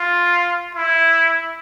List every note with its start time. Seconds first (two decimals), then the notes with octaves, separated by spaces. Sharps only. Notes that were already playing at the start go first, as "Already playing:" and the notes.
Already playing: F4
0.75 E4